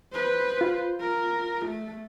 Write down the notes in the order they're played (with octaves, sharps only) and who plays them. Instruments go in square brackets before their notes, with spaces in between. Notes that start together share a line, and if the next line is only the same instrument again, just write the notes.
[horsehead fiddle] B4 C5
[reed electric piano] F4
[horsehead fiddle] A#4
A3